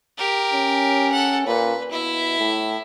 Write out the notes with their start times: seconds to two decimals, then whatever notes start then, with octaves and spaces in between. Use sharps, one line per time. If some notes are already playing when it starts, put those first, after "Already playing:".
0.18 G4 A#4
0.53 C#4
1.12 A4 F#5
1.47 A#2 B4
1.92 B2 E4 E5
2.39 A2